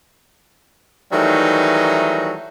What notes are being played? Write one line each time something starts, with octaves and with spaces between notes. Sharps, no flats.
D#3 E3 F#3 G3 A3 D#4